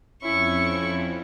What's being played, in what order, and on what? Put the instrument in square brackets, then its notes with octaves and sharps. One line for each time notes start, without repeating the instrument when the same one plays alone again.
[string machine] F2 [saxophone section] C#4 E4 [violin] C#6